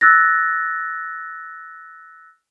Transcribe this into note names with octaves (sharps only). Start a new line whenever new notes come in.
E6 F#6 A6 A#6